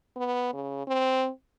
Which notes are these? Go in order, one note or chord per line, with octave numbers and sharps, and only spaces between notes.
B3
C#3
C4